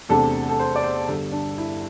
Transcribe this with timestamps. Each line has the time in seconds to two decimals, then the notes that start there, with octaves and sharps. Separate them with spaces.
0.09 E2 C3 A3 D4 A4
0.49 A4
0.59 C5
0.76 D5
0.83 C5
1.09 G1 G2 D3 A4
1.32 D4
1.58 E4